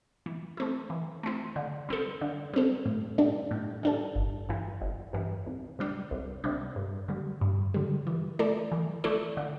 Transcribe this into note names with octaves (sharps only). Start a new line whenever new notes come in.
E3
A3 C4 E4
E3
A3 C4 E4
D3
G3 C4 A4
D3
G3 C4 A4
A2
G3 D4 A4
A2
G3 D4 A4
G1
G2 E3
G1
G2 E3
C2
C3 G3 D4
C2
C3 G3 D4
G2
D3 G3
G2
D3 G3
E3
A3 E4 A4 D5
E3
A3 E4 A4 D5
D3